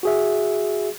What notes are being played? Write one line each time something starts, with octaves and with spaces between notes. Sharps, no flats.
F#4 G#4 E5